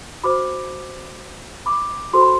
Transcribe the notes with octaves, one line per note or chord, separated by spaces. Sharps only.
F#4 C5 B5 D6
B5 D6
F#4 A4 C5 C6
B5